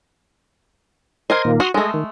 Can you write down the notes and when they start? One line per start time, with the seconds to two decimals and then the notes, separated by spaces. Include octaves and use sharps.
1.30 A#4 C5 D#5 C6 G#6
1.45 A#2 D#3 A#3
1.60 F#4 C6 D#6 F6
1.74 G#3 A3 G#4 A4 D#5
1.94 D#3